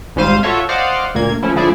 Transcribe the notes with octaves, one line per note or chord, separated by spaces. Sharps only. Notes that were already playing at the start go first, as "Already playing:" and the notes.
G#1 G#2 G3 C5 F5 D#7
F4 F#4 A4 C#5 E5
C5 D5 D#5 F5 F#5
D2 A#2 A#3 G#6
F3 A3 C#4 E4
D3 F3 A3 E4 G#4 D5